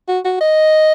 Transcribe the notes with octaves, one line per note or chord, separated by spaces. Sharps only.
F#4
F#4
D#5